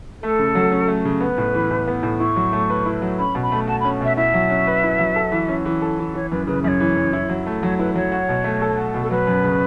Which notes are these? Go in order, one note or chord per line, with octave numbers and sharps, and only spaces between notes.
A3 A4
C#3
F#3
C#4
A3
C#3
B3 B4
A2
E3
A2
B3
A2
E4 C#6
F#3
A3
B4
E4
F#3
C#4 B5
B2
B5
A3
F#4 A5
B5
C#4
B2 E5
E4 E5
F#3
C#4
B4
E4
F#3
A4
E3
C#4
E3
A4
E3
E3 C#5
F#2 B4
C#3 B4
F#2 C#5 E5
E3
F#2
E4
F#3
A3
F#3 C#5
E4 B4
F#3 C#5
F#4
B2
A3
A4
F#4
B2
A4
F#3 B4
F#2
C#3